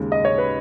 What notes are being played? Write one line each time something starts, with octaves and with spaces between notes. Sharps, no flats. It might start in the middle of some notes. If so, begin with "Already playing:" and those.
Already playing: D#2 C#3 G#3
D#5
C#5
B4